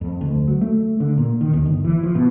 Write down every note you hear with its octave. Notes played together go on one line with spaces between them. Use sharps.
F2
D2
F#3
A3
D3
A#2
D#3
D#2
G1
E3
F3
B2